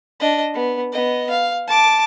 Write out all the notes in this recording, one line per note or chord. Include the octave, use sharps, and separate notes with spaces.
D4 D#5
B3
B3 D#5
F5
A5 D6